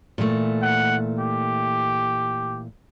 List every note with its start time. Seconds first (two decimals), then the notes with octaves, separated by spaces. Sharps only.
0.18 A#2 E3 A3
0.62 F#5
1.19 G4